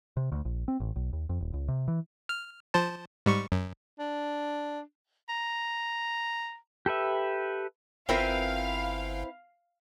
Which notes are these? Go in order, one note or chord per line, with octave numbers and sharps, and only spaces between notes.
C3
D2
A#1
C4
A1
B1
D#2
F2
D#1
C#2
C3
E3
F6
F3 C5 A5
G#2 G3 C#6
F#2
D4
A#5
G4 A4 B4 E5
G1 C4 E4 F4 A#4 B4 F5 G5